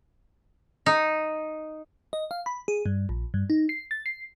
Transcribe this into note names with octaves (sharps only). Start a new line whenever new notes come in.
D#4
D#5
F5
B5
G#4
G2
A#1
G2
D#4
C7
A6
C7